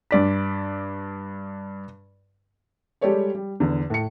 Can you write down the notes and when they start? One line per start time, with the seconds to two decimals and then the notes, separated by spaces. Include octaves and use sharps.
0.11 G2 D5 B6
3.01 G3 G#3 G4 A4 C#5 D5
3.35 G3
3.60 E2 D3
3.90 A2 C#7